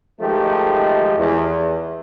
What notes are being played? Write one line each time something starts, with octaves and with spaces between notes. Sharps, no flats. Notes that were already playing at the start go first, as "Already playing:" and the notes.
D#3 F3 G#3 A3 G4 A4
E2